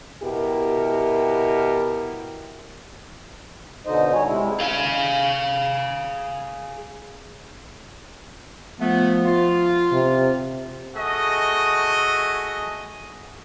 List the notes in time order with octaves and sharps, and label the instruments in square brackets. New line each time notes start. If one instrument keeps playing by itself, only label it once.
[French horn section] B2 E4 G4 A#4
[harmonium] B2 D3 D#4 C5 D#5
G3 C#5 G#5
C3 G#3 E4
[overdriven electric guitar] G#4 F5
[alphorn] F3 [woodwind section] A3 B3
[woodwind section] F4
[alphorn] C3
[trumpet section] A3 F#4 G#4 D#5